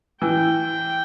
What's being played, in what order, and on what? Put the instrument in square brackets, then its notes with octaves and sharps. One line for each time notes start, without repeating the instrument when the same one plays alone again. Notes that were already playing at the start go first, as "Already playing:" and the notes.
[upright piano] E3 [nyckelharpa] G5